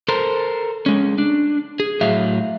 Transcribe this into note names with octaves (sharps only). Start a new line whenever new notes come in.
A4 A#4 C5
G#3 C#4
D4
G#4
A2 F#3 E5 F5